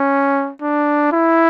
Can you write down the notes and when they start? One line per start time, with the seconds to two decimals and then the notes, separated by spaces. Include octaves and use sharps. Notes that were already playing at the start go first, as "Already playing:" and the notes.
Already playing: C#4
0.62 D4
1.12 E4